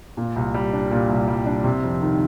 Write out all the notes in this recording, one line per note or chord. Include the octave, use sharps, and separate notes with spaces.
A#2
C2
G3
D4
A#2
C2
G3
D4
C3
F2
D#3